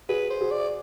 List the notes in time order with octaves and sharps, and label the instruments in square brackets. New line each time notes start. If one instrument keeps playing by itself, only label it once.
[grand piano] F#4 G#4 [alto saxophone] B4
[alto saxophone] C5
[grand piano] F#4 G#4
[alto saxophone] D5